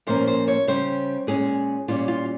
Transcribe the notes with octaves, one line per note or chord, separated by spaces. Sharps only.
A#2 F3 A#3 C#4 C5
C5
C#5
C#3 G3 C#4 C5
A#2 G#3 C#4 G#4
A#2 G3 C#4 F4
F4